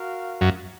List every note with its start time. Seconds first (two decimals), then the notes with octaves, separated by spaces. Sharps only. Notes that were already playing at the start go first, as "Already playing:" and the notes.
Already playing: F#4 A#4 F5
0.41 F#2